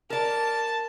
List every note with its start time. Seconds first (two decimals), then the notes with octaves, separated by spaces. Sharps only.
0.10 A#4 D5 A5